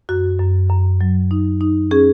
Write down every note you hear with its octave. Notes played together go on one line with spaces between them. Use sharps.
F#2 F#4
F#2
F#2
F#3
D#4
D#4
C#4 G#4